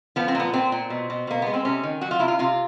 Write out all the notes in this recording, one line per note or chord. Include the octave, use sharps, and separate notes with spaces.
F3 B3
C4
A#2
B3
A#2 C4
A#2
B2
B2
B2 A#3
G#3 B3
C4
C3 C#4
D#3
F#3 F#4
F4
C3 E4
F4
C3 F4